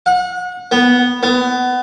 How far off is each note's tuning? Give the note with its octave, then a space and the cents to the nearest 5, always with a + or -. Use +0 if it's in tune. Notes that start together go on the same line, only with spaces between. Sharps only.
F#5 -35
B3 -5
B3 +20